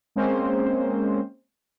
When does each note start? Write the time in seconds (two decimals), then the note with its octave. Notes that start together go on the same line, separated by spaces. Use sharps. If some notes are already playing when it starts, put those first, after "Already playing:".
0.16 G#3 A#3 C4 C#4 C5